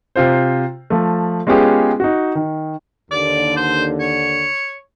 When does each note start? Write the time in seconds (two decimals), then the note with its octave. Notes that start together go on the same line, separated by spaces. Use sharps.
0.16 C3 F4 C5
0.90 F3 A3
1.47 G#3 B3 C#4 F4 G4 G#4
2.00 D#4 F#4
2.35 D#3
3.11 D#2 D3 D5
3.57 C5
4.00 C#5